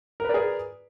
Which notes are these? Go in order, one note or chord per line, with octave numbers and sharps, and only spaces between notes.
G#4 A#4 B4 D5